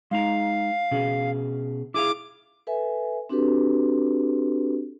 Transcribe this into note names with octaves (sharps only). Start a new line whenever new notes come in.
G#3 D#4 F5 A#5
B2 C#4 G#4
E4 G#4 F5 D6
A4 B4 E5 G#5
C4 D4 F#4 G4 A4 B4